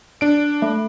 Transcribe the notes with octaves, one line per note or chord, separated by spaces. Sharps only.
D4 D7
A3